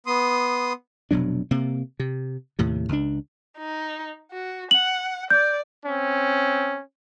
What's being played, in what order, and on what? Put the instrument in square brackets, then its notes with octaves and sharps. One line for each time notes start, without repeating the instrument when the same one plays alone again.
[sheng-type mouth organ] B3 C6 D#6
[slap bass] F1 B2 F#3 D4
C3 A#3
C3
D#2 A2 C3
C#2 D4
[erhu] D#4
F#4
[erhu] F#5 [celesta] F#7
[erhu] D5 [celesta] G6
[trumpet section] C4 C#4